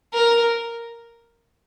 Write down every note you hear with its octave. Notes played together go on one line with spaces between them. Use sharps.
A#4